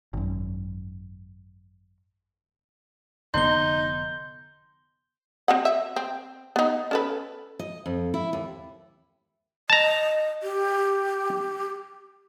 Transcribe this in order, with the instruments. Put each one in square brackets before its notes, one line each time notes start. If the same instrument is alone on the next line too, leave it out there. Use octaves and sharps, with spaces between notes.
[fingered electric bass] G#1 F#2
[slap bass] F1 D3 B3 [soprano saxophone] D#4 [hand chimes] C6 [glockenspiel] G6 G7
[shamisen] C4 F#4 F#5
E5
C4
B3 D#4
C#4 A4 B4
[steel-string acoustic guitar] D#5
F2
E4
D#2
[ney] D#5 [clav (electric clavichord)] A5 A#5
[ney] G4